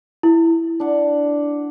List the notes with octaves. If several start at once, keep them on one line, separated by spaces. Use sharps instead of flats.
E4
D4 F#5